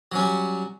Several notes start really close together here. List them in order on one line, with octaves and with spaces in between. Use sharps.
F#3 C#4 G3